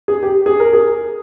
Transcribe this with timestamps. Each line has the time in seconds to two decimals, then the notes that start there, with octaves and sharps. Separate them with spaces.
0.08 G#4
0.23 G4
0.46 G#4
0.60 A#4
0.73 G#4